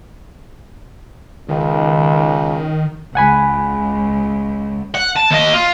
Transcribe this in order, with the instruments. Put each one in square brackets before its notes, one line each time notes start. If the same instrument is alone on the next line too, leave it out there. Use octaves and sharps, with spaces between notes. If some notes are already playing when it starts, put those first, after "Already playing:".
[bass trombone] C#2 [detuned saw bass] D#3
[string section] C#2 [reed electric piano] F#5 G#5 B5
[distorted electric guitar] F#5
A5
D#2 D#5
F4